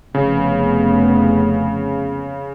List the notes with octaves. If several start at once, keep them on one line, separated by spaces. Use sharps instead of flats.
F1 C#3 B3